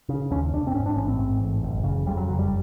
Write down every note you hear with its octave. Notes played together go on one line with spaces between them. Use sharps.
C#3
D#2 C#4
F1 D4
C4
G#2 C#4
D4
A1 C#4
C4
G#2
A1
F#1
C#3
F2 G3
F#3
F#1 F#3
G3